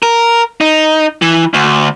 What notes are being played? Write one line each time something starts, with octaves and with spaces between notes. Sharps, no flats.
A#4
D#4
E3
D2